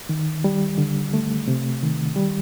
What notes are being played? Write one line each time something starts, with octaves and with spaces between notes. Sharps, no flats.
D#3
G3
D3
A3
C3
D#3
G3